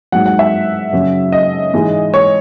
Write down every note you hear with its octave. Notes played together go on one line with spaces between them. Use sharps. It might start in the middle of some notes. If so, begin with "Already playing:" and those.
G#2 F#3 F#5
F#5
E5
F#2 C#3 F#3
D#5
G#2 E3 G#3
C#5